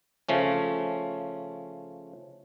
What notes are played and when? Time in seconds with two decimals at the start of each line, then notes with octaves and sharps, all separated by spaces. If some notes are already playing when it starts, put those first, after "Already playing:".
0.29 C#3 F3 A3 C#4